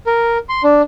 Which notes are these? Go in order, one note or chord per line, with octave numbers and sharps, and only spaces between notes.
A#4
C6
D4